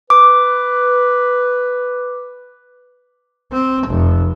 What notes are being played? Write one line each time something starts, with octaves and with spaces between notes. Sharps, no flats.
B4 D6
C4
F1